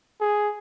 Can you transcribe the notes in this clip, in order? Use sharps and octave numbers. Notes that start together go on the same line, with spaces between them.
G#4